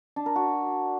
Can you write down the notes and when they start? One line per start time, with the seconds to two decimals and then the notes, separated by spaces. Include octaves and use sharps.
0.16 D4
0.26 A#4
0.36 F#4